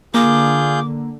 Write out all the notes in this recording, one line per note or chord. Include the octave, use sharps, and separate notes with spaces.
D3 A#3 F4 G#4 D6 G6